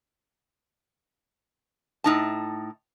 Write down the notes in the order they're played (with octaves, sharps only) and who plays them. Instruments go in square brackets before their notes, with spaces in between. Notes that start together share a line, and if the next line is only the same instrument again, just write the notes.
[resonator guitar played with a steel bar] A2 D#4 A5